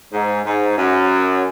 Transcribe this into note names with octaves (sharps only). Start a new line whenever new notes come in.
G#2
G#2
F#2